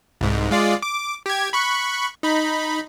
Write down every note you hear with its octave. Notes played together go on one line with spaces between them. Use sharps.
C2 G#2
G#3 F4 D5
D6
G4 G#6
B5 C#6 F#6
D#4 B5